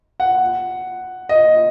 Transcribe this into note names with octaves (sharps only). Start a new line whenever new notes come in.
F#5
D#5